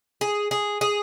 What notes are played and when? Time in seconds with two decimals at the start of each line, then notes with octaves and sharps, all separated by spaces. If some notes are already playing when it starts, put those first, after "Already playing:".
0.21 G#4
0.51 G#4
0.81 G#4